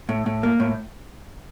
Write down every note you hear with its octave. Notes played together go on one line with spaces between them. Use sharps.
A2
A2
A#3
A2